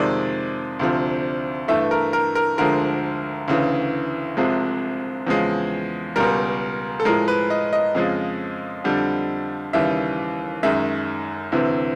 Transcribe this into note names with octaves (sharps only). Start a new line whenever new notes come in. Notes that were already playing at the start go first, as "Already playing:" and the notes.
Already playing: F2 C3 D#3 G#3 D5
D2 C3 F3
G2 E3 A3 E5
A#4
A#4
A#4
D2 D3 F3 G#3 A#4
D2 C#3 E3
C2 C3 F3 G#3
E2 C#3 F3 G#3
C#2 B2 G3 A#4
A4
A2 F3 G#3 A#4
B4
D#5
D#5
F2 C#3 F3 G#3
F2 D3 G3
D#2 C#3 E3 G3 E5
F#2 D#3 G#3 E5
D2 C3 E3